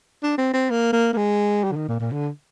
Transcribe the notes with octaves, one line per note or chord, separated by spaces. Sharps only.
D4
C4
C4
A#3
A#3
A#3
G#3
G3
D3
D#3
A#2
A#2
D3